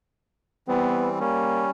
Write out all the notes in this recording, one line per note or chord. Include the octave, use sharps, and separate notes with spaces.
E3 G3 B3 C4
G3 A#3 C#4